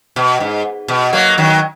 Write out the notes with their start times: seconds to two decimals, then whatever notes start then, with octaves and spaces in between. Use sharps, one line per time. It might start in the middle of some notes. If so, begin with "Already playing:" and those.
0.16 B2
0.40 G#2
0.88 B2
1.13 F#3 A#3
1.38 D#3 F#3